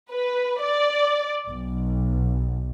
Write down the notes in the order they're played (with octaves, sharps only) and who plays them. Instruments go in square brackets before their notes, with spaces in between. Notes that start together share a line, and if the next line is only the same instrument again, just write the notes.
[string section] B4
D5
B1